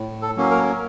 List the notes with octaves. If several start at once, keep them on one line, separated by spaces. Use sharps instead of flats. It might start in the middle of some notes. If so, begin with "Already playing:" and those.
Already playing: A2
A4
F#3 A#3 C#4
A#4